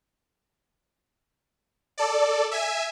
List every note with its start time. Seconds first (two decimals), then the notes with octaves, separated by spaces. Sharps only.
1.98 A4 D5
2.51 E5 G#5